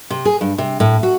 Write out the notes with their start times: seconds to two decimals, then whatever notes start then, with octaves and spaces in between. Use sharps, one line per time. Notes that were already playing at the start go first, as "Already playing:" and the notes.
0.10 C3
0.25 G#4
0.41 G2
0.58 C3
0.80 A2
1.03 F#4